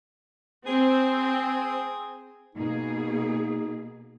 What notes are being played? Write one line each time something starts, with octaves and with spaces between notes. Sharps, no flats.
C4 G#4
B2 A#3 D#4 G#4